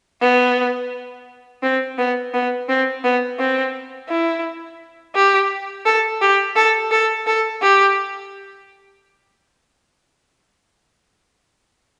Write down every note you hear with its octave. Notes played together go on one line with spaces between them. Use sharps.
B3
C4
B3
B3
C4
B3
C4
E4
G4
A4
G4
A4
A4
A4
G4